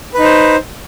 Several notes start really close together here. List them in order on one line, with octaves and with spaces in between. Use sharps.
B4 D#4 C5